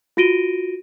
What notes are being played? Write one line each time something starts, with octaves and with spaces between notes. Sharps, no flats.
F4 F#4 A#6 D7 D#7 G7